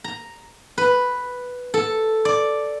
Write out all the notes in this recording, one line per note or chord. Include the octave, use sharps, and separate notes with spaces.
A#5
B4
A4
D5